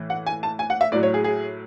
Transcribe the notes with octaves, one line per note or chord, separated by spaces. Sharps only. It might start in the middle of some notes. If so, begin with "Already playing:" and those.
Already playing: A2 E3
F#5
G#5
A5
G#5
F#5
E5
A2 F#3 D5
C#5
G#4
G#4